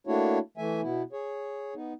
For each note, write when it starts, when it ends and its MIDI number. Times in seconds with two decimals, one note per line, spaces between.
0.07 0.39 57
0.07 0.39 58
0.07 0.39 62
0.07 0.39 64
0.07 0.39 66
0.07 0.39 73
0.57 0.81 52
0.57 0.81 57
0.57 0.81 76
0.57 0.81 80
0.81 1.03 47
0.81 1.03 59
0.81 1.03 64
1.13 1.74 68
1.13 1.74 73
1.75 1.93 59
1.75 1.93 63